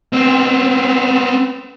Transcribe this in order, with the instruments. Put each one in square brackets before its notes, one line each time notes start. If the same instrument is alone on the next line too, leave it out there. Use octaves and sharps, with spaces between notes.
[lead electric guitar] B3 C4